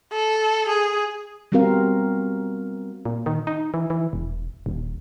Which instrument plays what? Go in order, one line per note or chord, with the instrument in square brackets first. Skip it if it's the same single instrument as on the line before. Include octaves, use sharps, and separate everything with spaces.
[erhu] A4
G#4
[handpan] G3 B3 C4 F#4 A#4 F5
[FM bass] A#2
D#3
D#4
E3
E3
E1
D#1